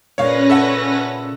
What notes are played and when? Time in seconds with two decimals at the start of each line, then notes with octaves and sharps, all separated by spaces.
0.18 A#2 C#3 C#4 D4 B4 C#5 F5 A#6
0.50 A4 E5 F#5